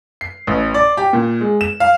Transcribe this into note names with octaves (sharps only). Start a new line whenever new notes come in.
C7
A1
D5
G4
A#2
G#3
E7
F5